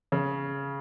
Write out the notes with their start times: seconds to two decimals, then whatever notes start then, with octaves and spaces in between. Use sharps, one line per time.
0.12 C#3